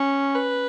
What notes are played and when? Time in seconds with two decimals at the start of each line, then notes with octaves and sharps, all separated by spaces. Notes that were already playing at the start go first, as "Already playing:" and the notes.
Already playing: C#4
0.35 B4